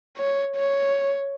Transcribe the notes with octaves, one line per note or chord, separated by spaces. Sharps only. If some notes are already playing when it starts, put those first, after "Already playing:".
C#5
C#5